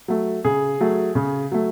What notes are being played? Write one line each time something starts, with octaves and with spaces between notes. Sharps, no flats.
F#3 A3
C#3 G#4
F#3 A3
C#3
F#3 A3